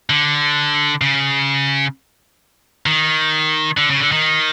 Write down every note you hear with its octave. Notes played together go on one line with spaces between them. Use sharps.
D3
C#3
D#3
D3
C#3
D3
D#3